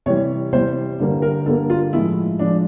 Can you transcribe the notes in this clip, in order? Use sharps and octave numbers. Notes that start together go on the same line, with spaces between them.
C3 E3 G3 C#5
C3 E3 G3 C5
G2 D3 G3 A#3
A#4
G2 D3 G3 A#3 A4
F4
A2 F3 G#3 E4
A2 F3 G#3 D4